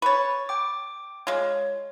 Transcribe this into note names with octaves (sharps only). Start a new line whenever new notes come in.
B4 C#5 C#6 A6
G5 D6
G#3 F4 C#5